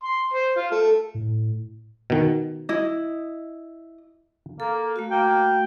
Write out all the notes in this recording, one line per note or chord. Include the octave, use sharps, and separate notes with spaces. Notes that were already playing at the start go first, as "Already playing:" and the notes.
C6
C5
F4
A3
A2
B2 D#3
E4 D#5
A#3 A4
A3 F#4
A#3 G5